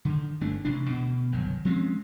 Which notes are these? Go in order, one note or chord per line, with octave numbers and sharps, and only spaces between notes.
D3 D#3
G1 A3 D4
A1 C3 E3 D4
D2 B2
G1 C2 D#3 F#3
F3 G#3 C4 C#4